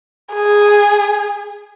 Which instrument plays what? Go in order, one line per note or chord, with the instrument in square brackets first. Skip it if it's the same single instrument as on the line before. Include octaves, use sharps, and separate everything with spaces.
[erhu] G#4